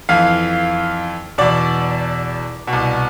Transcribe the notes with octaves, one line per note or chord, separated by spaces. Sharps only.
F2 E3 F5
E2 B2 D5
B2
C2